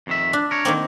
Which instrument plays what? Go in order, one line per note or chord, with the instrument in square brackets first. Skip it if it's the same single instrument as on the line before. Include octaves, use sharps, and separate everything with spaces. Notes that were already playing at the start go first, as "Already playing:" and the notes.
[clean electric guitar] F2 D#3 E5
[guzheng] D4
[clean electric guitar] A#4 C#5
[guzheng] D#3 A#3 C4